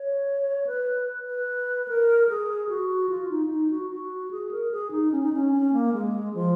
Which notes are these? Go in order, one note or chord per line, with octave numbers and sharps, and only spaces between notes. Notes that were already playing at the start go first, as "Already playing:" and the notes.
Already playing: C#5
B4
B4
A#4
G#4
F#4
F4
D#4
F4
D#4
F#4
F#4
G#4
A#4
G#4
D#4
C#4
D#4
C#4
C#4
A#3
G#3
F3